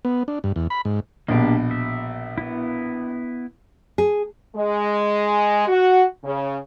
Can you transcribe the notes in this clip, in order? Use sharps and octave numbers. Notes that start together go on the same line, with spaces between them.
B3
D4
G2
E2
B5
G#2
A#1 B2 A#3 D4 G4
E5
B3 E4
G#4
G#3
F#4
C#3